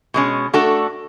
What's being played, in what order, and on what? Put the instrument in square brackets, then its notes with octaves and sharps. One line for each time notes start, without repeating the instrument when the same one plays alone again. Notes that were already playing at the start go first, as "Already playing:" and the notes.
[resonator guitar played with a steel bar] B2 G#3 C#4
A3 D4 F#4 A4